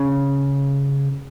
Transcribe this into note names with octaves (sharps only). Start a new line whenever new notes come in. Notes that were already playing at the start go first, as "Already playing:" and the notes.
Already playing: C#3